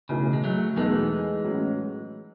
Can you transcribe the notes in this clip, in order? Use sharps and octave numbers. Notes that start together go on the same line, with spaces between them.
B1 A2 C#3 E3
G#3
F#3 A3
E2 B2 E3 G#3 A3 D#4 A4
A2 F#3 C#4